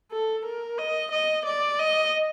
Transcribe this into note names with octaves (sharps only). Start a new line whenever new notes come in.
A4
A#4
D#5
D#5
D5
D#5